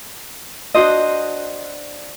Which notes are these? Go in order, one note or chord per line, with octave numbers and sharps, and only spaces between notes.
D4 F#4 C5 D#5